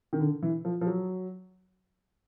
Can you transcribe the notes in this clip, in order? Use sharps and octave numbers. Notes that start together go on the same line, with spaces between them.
D#3
D3
E3
F3
F3
F#3